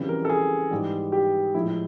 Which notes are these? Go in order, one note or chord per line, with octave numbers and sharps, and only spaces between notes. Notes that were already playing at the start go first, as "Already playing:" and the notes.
Already playing: F2 C#3 E3 G3
A#4
A4
G#4
G#2 E3 G3
G4
A2 F3 G#3 E4